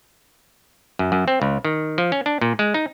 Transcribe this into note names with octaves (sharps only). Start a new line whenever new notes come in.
F#2
F#2
C4
C#2
D#3
F3
C#4
D4
A#2
G#3
D#4